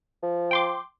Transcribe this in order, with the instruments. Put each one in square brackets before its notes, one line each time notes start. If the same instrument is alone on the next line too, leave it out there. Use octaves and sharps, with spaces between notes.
[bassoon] F3
[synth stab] G5 C6 D6